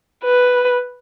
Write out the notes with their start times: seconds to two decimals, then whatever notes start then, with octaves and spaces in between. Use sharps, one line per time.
0.24 B4